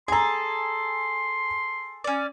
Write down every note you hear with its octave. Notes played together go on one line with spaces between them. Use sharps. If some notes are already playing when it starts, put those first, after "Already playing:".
G#4 A4 G#5 A#5 C6
C#4 D5